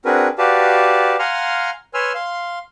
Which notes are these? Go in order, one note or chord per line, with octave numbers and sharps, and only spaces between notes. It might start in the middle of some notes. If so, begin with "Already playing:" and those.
C4 D4 F#4 G#4 A#4 B4
F#4 G4 B4 D5 F5 A5
F5 F#5 G#5 A#5 C6 F6
B4 C#5 G#5 C6 E6 F6
F5 C6